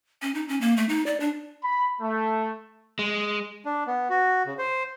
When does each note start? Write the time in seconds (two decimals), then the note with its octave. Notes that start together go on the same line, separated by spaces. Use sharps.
0.22 C#4
0.35 D#4
0.49 C#4
0.61 A#3
0.77 A3
0.89 D#4
1.06 D5
1.20 D4
1.63 B5
2.01 A3
2.99 G#3
3.65 D4
3.87 B3
4.10 F#4
4.46 C#3
4.59 C5